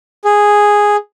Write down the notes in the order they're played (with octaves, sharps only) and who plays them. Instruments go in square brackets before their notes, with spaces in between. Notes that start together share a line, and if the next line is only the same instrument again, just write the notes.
[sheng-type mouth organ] G#4